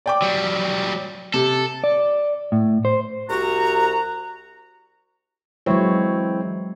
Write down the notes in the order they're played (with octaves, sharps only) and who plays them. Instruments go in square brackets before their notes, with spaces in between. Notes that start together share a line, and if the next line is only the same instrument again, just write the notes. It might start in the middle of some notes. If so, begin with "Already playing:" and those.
[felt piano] D5 G5 D6
[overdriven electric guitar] F#3 G3
[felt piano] C3 [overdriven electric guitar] A4
[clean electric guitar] D5
A2
C5
[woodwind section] C2 F#4 A#5
[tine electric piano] E3 C4 E4 [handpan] F#3 G#3 C#5